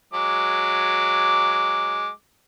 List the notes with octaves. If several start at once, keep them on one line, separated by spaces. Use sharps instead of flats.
F#3 G#3 D6